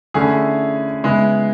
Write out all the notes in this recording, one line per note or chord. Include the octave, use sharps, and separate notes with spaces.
D3 A3 C#4 E4 G#4
C#3 G#3 B3 E4